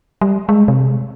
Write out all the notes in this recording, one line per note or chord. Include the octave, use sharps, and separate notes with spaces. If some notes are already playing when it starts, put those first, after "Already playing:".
G3
G#3
C3